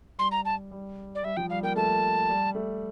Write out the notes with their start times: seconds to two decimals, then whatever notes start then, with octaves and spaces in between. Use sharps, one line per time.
0.18 G3 C6
0.31 A#5
0.45 A5
0.71 G3
1.15 D5
1.23 G3 E5
1.37 F3 G5
1.50 G3 F5
1.63 A#3 G5
1.76 A3 A5
2.29 G3
2.55 A3